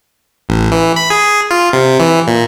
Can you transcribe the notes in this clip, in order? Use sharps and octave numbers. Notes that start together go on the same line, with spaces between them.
A1
E3
B5
G#4
F4
C3
E3
A#2